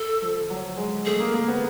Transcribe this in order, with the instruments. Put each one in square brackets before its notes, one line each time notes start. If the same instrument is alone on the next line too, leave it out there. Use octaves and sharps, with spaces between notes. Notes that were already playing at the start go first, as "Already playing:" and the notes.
Already playing: [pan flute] A4
[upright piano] F3
F#3
G#3
[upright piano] A3 [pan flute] G#4
[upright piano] A#3
A#3
B3